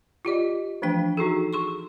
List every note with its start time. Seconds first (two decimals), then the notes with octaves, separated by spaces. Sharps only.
0.25 F4 G4 D5 D#5
0.82 E3 F3 A3 D4 G5
1.17 D#4 F#4 G#4 A4
1.53 G#4 C6 C#6